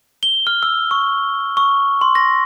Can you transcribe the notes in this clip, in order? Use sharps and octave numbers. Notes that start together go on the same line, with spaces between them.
G7
F6
E6
C#6
C#6
C6
A#6